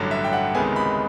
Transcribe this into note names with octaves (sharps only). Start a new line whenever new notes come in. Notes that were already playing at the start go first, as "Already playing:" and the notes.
Already playing: A1 G2 D3 F#3
E5
G5
F#5
C#2 C3 D#3 G#3 B3 G#5
B5